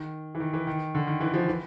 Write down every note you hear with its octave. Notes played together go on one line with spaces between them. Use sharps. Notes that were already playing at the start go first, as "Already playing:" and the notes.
Already playing: D#3
E3
D#3
E3
D#3
D3
D#3
E3
F3
E3